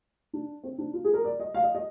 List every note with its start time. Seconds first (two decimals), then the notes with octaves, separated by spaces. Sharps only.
0.33 D4
0.63 C4
0.78 D4
0.93 F4
1.04 G#4
1.14 A#4
1.24 D5
1.40 D#5
1.54 F5
1.63 D#5
1.75 D#5